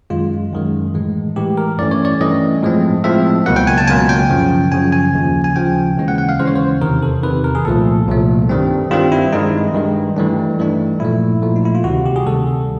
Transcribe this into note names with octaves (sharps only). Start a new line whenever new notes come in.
F#2 D#3 G#3 F4
F#2 D#3 G#3
A2 E3 G#3
A2 E3 G#3 G4
A#4
G2 E3 A3 C#4 D5
C#5
D5
G2 E3 A3 C#4 D#5
A2 F3 G#3 C4
A2 F3 G#3 C4 E5
C#2 B2 F#3 A#3 F#5
G5
G#5
A5
C#2 B2 F#3 A#3 G#5
G5
F#2 C#3 F3
F#2 C#3 F3 G#5
G#5
D#2 C#3 F3
G#5
D#2 C#3 F3 G5
D#2 C#3 E3 G#3 C#4
F#5
F#5
F5
D#2 C#3 E3 G#3 C#4 C5
C#5
C5
E2 C3 D#3 A#4
A4
E2 C3 D#3 B4
A#4
G#4
C2 A#2 F3 A3 A4
C2 A#2 F3 A3
G2 D#3 G3 C4
G2 D#3 G3 C4 F4
E4
G2 D#3 G#3 D#4
G2 D#3 G#3
G2 E3 A3 D4
G2 E3 A3 D4
A#2 F3 A3 E4
A#2 F3 A3
D#4
E4
F4
D2 C3 D#3 G3 F#4
G4
G#4
D2 C3 D#3 G3 A4